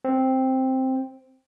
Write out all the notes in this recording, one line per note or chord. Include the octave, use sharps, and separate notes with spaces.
C4